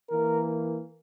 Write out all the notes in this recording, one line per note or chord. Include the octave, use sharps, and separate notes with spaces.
E3 A#3 A#4